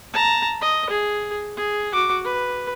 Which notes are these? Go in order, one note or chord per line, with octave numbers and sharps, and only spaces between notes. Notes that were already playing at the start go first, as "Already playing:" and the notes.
A5 A#5
D#5
G#4
G#4
F#4 D6
B4